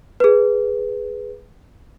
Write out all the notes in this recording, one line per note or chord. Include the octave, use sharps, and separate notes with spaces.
G#4 B4